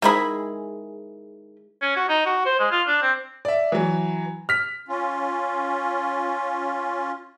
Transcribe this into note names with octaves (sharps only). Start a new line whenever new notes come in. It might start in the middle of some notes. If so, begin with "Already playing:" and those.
D#3 G#3 E4 G#4 B5
C#4
F#4
D#4
F#4
C5
G#3
F4
D4
C4
D5 E5
E3 F#3
F6 B6
C#4 F4